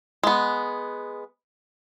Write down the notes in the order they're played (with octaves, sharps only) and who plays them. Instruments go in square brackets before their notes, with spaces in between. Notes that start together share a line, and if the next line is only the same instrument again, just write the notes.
[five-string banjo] G#3 B3